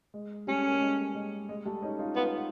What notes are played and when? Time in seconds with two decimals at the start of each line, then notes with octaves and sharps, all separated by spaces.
0.14 G#3
0.47 G3 A3 C#4
0.67 A#3
0.74 A3
0.81 G#3
1.15 G#3
1.49 G#3
1.65 G3 A3
1.82 C#4 D#4
1.99 D#4 F4
2.16 B3 D#4 F4